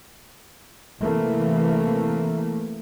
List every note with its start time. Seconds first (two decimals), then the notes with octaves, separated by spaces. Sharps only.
1.00 C3 E3 A3 A#3